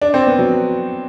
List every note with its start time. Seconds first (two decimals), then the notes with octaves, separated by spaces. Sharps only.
0.02 D4
0.14 C4
0.27 B3
0.39 F#3